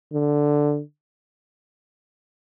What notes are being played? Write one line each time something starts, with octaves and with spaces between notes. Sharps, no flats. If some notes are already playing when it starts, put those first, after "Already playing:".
D3